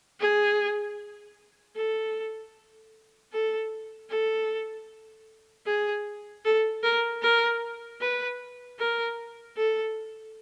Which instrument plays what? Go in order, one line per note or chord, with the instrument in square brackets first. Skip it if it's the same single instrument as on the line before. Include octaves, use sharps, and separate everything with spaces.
[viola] G#4
A4
A4
A4
G#4
A4
A#4
A#4
B4
A#4
A4